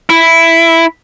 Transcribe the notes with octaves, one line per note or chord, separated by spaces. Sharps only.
E4